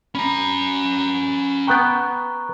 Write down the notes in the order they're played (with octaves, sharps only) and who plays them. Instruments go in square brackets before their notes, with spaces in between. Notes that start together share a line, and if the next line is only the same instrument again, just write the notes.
[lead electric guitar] C#4 A#5 [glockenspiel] B5
[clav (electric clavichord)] B3 G5 [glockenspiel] A#5 C#6 F#6